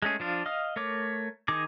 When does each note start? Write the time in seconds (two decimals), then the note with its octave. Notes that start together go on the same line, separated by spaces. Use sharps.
0.02 G#3 A3 C#4 G#4
0.20 F3 D4 F4
0.46 D#5 F5 D#6 F6
0.76 A3 A#4 C#5 D6
1.48 D#3 D#4 G#4 D6